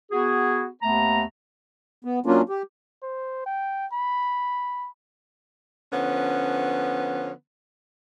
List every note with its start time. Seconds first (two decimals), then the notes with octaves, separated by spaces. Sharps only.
0.11 B3 F#4 G#4
0.82 D#2 A3 B3 A#5
2.05 B3
2.26 F#3 A#3 C#4 D4 F4
2.49 G4
3.03 C5
3.46 G5
3.92 B5
5.92 D3 F3 B3 C#4